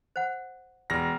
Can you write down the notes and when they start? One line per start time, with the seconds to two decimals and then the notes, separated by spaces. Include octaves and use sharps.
0.16 C5 F#5
0.90 E1 A#6